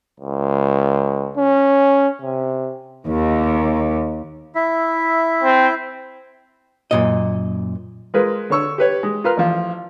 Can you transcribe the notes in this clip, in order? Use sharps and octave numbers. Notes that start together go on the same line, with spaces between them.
C#2
C#4
C3
D#2
E4 E5
C4
F#2 A#2 D#5
G#3 F4 G#4 A#4 B4
D3 D4 C#5 C#6 E6
G4 B4 C#5
G#3
F4 A#4 B4 A#5 C6 F6
A1 F3